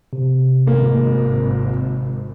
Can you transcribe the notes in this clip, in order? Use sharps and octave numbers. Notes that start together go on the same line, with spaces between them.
C3
G#1 A#3